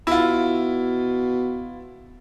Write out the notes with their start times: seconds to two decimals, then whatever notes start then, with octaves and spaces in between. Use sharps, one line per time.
0.07 B2 E4 F4